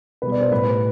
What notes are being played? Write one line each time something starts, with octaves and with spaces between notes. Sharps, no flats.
B2 G3 B4
D5
C5
A2 G3 B4